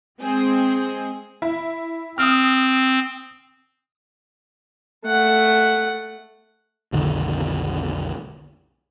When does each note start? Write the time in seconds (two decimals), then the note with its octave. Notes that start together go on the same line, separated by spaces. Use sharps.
0.19 G#3 C4 G#4
1.42 E4
2.18 C4 D#6 F6
5.05 A3 F#5
6.92 B1 F2 D3 D#3